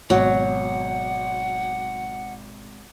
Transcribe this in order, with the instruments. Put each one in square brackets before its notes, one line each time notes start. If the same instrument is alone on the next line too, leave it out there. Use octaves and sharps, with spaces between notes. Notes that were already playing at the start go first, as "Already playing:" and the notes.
[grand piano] G#1 B2 [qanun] F#3 [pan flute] F#5